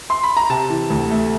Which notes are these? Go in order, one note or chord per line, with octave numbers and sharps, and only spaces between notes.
C6
B5
A#5
C3 A5
E3
D2
A3